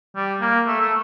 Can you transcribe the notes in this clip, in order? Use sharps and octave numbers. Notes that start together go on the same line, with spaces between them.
G3
A#3
A3
A3